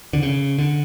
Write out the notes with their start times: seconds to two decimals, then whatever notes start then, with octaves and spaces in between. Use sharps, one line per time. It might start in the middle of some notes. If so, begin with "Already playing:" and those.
0.13 D3
0.23 C#3
0.58 D3